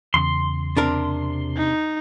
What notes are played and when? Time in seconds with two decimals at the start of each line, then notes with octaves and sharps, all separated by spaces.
0.14 E2 C#3 C6
0.77 C3 D4 A#4
1.57 D#4